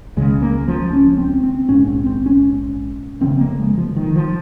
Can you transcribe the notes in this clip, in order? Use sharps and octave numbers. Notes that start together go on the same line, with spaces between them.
C#2 C#3 G#3
A#3
F3
C#4
C4
C4
A#1 G#2 C#4
C4
C4
C#4
F1 F2 C#3 C4
A#3
G#3
F3
D#3
F3